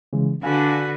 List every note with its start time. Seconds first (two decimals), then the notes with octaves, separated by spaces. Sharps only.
0.13 C#3 E3 G#3
0.43 D3 D4 F#4 B4 F5 G#5